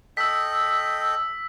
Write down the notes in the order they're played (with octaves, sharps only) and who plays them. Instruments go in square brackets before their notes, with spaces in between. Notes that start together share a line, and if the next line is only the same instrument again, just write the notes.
[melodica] A4 D#5 G5 [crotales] E6 B6